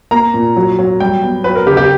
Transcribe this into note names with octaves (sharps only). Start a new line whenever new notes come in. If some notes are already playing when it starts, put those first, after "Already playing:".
A#3 A#5
A#2
F#3
F#3
G3 G5
B3
F#3 B4
A#4
C#3 G4
G4